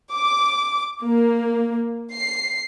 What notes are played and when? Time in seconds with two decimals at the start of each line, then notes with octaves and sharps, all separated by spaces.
0.14 D6
1.03 A#3
2.14 C7